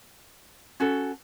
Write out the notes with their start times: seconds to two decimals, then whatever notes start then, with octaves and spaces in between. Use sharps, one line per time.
0.80 C#4 F#4 A4